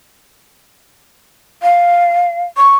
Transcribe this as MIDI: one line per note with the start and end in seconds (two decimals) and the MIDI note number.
1.62 2.42 77
2.56 2.75 85